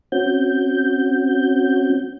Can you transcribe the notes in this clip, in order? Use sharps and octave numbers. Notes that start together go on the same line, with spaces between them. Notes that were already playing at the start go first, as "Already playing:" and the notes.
C4 C#4 F#4 G6